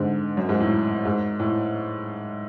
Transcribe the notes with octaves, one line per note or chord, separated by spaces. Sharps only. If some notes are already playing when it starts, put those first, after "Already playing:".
Already playing: G#2 D3
F#2
G#2
A2
G#2
A2